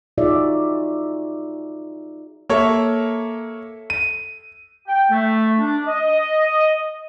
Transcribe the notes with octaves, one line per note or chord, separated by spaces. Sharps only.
D#4 F4 F#4 G#4 D5 E5
A#3 A4 C#5 E5
D#7
G5
A3
D4
D#5